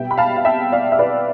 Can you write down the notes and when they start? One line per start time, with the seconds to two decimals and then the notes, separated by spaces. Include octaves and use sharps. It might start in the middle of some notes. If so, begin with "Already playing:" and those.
Already playing: B2 G3 B3 E5 G5
0.11 B5
0.17 F5 A5
0.37 F5
0.45 E5 G5
0.72 D5 F5
0.92 E5
0.99 B4 D5